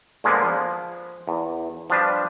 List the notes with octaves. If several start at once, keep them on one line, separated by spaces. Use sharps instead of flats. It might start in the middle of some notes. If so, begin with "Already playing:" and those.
A#2 D3 F3 G#3 A#3 B3
F3
E2
F3 G3 D4 B4